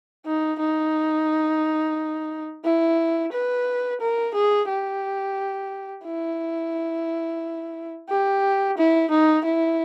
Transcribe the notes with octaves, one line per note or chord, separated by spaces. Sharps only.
D#4
D#4
E4
B4
A#4
G#4
G4
E4
G4
E4
D#4
E4